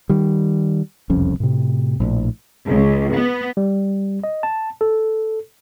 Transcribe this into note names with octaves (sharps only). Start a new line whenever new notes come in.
D#3 G3
E1 C2 F2 C#4
A2 C3
A#1 A2
C#2
B3
G3
D#5
A5
A4